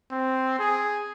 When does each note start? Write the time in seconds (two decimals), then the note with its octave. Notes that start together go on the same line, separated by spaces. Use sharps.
0.11 C4
0.60 G#4